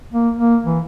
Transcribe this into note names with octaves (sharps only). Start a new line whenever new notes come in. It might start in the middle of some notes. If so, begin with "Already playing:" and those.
A#3
A#3
E3